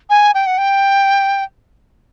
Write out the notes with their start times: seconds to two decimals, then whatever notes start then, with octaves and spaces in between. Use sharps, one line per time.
0.10 G#5
0.34 G5
0.46 F#5
0.58 G5